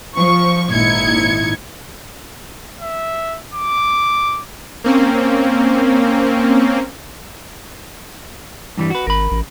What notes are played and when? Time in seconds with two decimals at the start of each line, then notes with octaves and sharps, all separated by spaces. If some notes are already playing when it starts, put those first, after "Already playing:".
0.16 F3 C#6
0.71 G#1 A#2 D#4 E4 G#6 C#7
2.81 E5
3.54 D6
4.84 A#3 C4 C#4
8.78 G2 E3 G3
8.90 F#4 B4
9.07 G#1 A#4 B5
9.31 A1